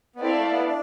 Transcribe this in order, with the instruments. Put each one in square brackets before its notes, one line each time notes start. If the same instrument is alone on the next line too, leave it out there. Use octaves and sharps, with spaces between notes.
[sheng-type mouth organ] B3
[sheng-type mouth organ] C4 [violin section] E4 A4 D5 F5
[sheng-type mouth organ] A3
B3
D4